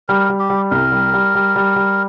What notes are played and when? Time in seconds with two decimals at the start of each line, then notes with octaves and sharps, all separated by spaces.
0.08 G3 A#4
0.29 G3
0.39 G4
0.50 G3
0.71 C2 A#4
0.92 G3
1.13 G3
1.35 G3
1.56 G3
1.76 G3